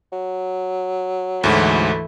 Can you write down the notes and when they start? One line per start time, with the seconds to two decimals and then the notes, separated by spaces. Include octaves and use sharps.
0.12 F#3
1.44 D2 G#2 E3 A3 E4